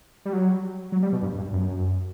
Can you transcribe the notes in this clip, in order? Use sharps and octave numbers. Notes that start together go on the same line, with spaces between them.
G3
F#3
F#3
G3
B2
G2
G2
F#2